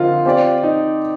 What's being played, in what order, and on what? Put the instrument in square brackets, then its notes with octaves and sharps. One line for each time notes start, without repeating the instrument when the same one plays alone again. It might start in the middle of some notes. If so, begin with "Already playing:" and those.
Already playing: [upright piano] D3 F3 C4 D#4 A#4 [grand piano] F4
[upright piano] C4 G4 D5
[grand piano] D#4